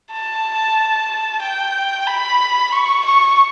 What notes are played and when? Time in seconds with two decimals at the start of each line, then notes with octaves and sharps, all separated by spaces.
0.12 A5
1.42 G5
2.07 B5
2.72 C#6
3.05 C#6